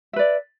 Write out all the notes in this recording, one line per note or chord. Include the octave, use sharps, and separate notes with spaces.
B4 D5 E5